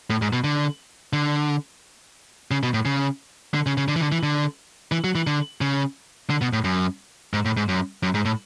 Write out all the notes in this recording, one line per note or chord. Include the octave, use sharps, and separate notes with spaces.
A2
G#2
B2
D3
D3
C#3
B2
A2
C#3
D3
C#3
C#3
D3
E3
D3
E3
D3
E3
F#3
E3
D3
C#3
D3
B2
A2
F#2
G#2
A2
G#2
F#2
F#2
G#2
A2